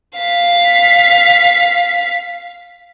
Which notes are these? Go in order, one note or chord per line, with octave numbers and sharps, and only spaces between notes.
F5 B6